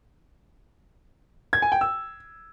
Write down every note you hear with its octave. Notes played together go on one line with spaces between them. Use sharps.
G#6
G#5
G5
E6